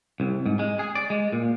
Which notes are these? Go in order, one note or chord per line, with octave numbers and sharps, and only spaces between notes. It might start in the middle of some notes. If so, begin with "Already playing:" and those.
C2
G#2
G#3
G#4
D5
G#3
A#2